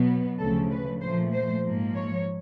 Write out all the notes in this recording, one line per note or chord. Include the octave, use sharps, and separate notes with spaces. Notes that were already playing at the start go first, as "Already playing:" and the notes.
Already playing: B2 F#3 B3
D2 C#3 F3 A3 A4
B4
A#2 F3 A3 C5
C5
G#2 F3 A#3
C#5